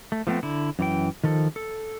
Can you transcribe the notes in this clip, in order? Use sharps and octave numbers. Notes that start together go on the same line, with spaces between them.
A3
F3 A3 B3 C4
D3 E4
F#2 E3 G5
D#3 F3 A4
A4